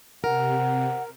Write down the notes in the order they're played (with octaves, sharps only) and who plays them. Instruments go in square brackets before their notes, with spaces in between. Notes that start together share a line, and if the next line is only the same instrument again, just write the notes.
[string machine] C3 [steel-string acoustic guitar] A#4 [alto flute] F#5